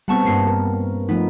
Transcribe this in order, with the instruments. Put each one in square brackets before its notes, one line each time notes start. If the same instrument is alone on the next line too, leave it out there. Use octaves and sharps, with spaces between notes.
[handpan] G3 B3 C4 [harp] F#5 A5 C#6
[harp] G2 C7 C#7 [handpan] A#3
[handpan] A#4
[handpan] F3 A3 D#4 [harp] B3